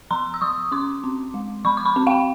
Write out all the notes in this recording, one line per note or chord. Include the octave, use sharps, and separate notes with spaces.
F3 A#5 C6
E6
F3 C#6 D#6
C#4 C6 D6
C4
G#3
F3 B5 C#6
D6
B5 C#6
C4
F5 G5